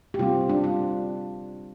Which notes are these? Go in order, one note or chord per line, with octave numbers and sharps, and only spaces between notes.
G4
C3 G3 C4 F4
D4
F4